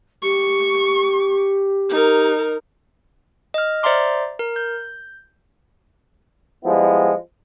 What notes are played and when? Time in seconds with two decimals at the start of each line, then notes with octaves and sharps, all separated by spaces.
0.23 G4 C#6
1.90 D#4 A#4
3.54 D#5 F6
3.83 C5 D5 E5 A#5 C6 D6
4.39 A#4
4.56 G6
6.65 F3 G3 G#3 B3 E4